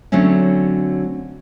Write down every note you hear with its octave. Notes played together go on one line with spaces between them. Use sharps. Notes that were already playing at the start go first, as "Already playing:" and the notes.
D3 F#3 A3 C4 C#4